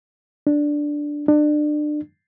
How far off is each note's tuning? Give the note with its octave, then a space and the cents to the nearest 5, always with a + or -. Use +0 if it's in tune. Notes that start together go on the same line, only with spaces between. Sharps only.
D4 +0
D4 +30